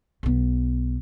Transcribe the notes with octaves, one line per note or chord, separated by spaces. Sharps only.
B1 B3